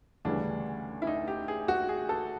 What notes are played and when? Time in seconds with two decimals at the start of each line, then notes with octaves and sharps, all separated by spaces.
0.25 D2 C#3 E3 G3 D4
1.02 E4
1.07 D#4
1.28 G4
1.48 G#4
1.68 F#4
1.89 G#4
2.09 A4